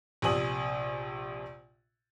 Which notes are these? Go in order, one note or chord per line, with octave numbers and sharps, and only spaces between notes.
A#1 C3 G#5 D#6 F#7